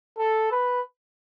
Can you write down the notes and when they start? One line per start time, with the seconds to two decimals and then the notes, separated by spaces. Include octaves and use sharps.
0.18 A4
0.52 B4